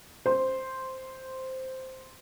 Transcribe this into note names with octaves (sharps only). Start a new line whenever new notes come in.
C5 C6